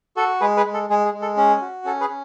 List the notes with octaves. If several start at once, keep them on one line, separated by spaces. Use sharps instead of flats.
F#4 A4
G#3 G#4 B4
G#4 B4
G#3
A4
G#3 G#4
G#4
G#3
A4
C#4 G#4
F#4
C#4 A4
G#4 B4
C#4